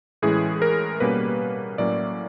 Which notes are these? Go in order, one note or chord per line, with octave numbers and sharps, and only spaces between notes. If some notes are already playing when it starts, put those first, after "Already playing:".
A2 E3 G#3 C#4 G#4
A#4
B2 G3 A#3 C#4 B4
A2 F#3 A#3 C#4 D5